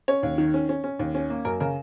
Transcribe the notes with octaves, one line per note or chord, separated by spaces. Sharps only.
C#4 C#5
D#2
D#3
C#4
C#4
C#4
D#2
C#4
A#3
F#2 A#4
C#3 A#4